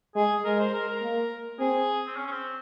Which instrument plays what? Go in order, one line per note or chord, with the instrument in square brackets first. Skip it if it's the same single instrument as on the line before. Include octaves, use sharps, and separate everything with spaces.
[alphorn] G#3 [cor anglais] G#4
[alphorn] G#3 [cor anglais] A#4
[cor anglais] C5
A#4
A#4
[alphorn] A#3
[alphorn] C4 [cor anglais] G#4
[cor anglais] C4
C#4
C#4
C4